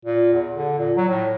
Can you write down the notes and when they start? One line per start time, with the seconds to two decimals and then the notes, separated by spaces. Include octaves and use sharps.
0.05 A#2
0.33 E2
0.55 D3
0.78 A#2
0.97 F#3
1.08 A2